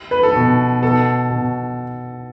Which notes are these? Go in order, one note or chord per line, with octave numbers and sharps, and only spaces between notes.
B4
A4
B2
B2 A4
B2